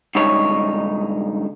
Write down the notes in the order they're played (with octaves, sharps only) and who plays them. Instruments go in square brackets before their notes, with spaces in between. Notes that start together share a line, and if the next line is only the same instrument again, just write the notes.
[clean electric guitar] C#2 G2 D#3 D#4 C#5